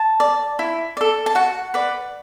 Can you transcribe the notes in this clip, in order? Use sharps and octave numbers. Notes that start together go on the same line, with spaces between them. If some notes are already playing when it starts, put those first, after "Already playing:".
Already playing: A5
D5
E4
A4 D5
A5
F#4 F#5
B4 D5